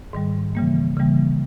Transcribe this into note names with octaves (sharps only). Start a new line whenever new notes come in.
G#2 D#3 G3
C#3 E3 G3 A#3
C#3 E3 G3 A#3